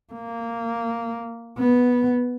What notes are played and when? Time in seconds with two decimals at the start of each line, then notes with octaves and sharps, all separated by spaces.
0.13 A#3
1.58 B3